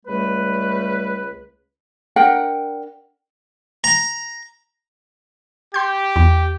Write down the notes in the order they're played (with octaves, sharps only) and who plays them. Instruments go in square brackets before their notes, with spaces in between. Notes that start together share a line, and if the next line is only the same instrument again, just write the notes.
[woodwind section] C#2 G3 A3 B4
[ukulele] D4 A#4 F#5 G5
[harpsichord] A#5
[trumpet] G4 [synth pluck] C6 G6
[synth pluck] E2